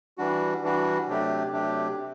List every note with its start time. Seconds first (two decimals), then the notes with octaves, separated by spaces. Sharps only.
0.18 E3 G3 D4 F#4
0.62 E3 G3 D4 F#4
1.07 C3 F#3 A3 D4 G4
1.52 C3 F#3 A3 D4 G4
1.97 C3